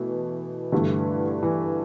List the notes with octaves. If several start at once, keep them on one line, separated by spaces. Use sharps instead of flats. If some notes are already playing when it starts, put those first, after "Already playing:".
Already playing: B2 E3 A3
G2 D3 E3 A3
E3